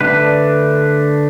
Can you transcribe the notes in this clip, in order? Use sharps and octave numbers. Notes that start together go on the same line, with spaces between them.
D3 A3 D4 B4